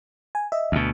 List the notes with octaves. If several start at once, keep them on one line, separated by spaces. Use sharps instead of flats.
G#5
D#5 E5
D2 B2